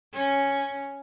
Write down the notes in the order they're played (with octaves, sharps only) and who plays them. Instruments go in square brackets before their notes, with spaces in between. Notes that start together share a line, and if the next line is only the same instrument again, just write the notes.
[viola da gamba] C#4